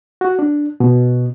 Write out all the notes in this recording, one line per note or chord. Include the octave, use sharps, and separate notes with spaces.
F#4
D4
B2